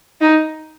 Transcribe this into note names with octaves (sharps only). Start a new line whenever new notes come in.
D#4